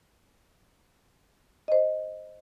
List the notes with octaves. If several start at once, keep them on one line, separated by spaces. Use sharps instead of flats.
C5 D#5